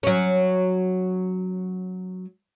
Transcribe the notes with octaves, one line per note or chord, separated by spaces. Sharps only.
F#3 C#4